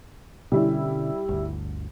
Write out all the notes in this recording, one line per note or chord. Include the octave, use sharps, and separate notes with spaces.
B2 D3 G3 C#4 E4
G1 D2 D3